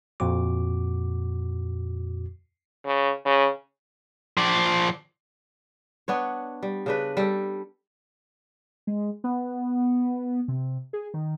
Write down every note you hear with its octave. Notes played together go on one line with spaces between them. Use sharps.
F2 A#2 F#4 D6
C#3
C#3
F3 D5
B3 D4 C#5
G3
C#3 D4 B4
G3 G4 A4
G#3
B3
C3
G#4
D#3